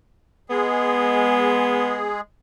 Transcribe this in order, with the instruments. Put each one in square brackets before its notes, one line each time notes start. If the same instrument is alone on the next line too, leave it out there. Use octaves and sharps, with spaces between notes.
[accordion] G#3 G#4 [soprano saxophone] B3